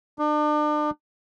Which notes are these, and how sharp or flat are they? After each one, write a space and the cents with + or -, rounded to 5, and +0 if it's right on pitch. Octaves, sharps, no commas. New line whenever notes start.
D4 +35